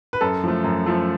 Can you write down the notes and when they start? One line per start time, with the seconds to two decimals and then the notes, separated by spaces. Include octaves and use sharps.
0.13 B4
0.21 F#2 A4
0.44 F3 A3
0.64 F#2
0.86 F3 A3